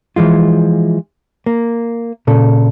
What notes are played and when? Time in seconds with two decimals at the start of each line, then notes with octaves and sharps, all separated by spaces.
0.16 E3 F3 G#3 F4
1.46 A#3
2.27 A#2 C#3 A4